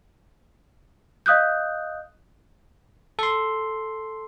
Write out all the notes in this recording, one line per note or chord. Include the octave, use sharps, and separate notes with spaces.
D#5 F5 D#6 F#6 G6
A4 C6